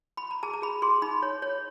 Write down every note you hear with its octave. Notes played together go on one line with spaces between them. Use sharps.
B5
A#5
G#4 A5
A#5
G#4 B5
G#4 C6
D#4 B5
C#5
C#5